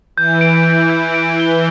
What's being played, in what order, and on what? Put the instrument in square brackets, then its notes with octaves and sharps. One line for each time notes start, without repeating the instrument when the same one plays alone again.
[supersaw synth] E3 [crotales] G6
[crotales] D7
D7
G6
D7
G7